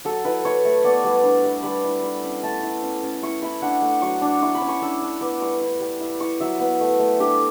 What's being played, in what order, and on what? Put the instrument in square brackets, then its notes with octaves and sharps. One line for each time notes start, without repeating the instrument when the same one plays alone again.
[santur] F#3 A4
E4 B4
E4 C#5
A3
B3 D5
G3
D4
G3
G3 B5
E4
G3 B5
C#4
A3 A5
E4
C#4
C#4
E4 C#6
E4 B5
D4 F#5
A3
F#3 C#6
D4
E4 C#6
B5
C#4
C#6
D4 E6
D4
B3 D6
G3 C#6
E4
G3
E4
E4 C#6
F#3 E5
B3
A3
A3
D4 G4